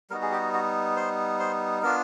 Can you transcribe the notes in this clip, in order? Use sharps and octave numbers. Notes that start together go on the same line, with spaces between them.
G3 B3 D#4 F#4 A#4
G#4
G4
F#4
C5
C5
B3 D4 F4 A#4